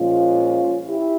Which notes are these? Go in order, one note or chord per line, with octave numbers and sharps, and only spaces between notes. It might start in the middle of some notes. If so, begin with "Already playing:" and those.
Already playing: A#2 F3 G#3 C#4 F4
E4 G4